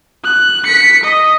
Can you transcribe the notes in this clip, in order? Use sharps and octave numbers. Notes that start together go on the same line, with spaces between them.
F#6
B6 C#7
D#5